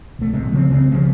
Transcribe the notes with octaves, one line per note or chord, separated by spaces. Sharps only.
B1 A3
A1 C3 G#3
C#3 F3 G#3 C4
C2 C#3 G#3 C4
C#3 F3 G3 G#3